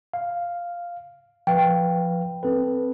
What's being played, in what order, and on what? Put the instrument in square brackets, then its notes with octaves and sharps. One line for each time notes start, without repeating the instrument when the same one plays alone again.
[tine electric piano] F5
[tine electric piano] F3 B4 F5 [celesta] G5
[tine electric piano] C4 A4 B4